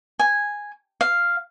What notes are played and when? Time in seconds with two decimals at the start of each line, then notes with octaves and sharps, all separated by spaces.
0.19 G#5
1.01 F5